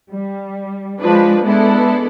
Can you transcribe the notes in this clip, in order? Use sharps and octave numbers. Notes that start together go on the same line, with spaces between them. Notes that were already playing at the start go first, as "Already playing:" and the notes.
G3
F3 G#3 D4 B4
G#3 B3 D4 E4 A4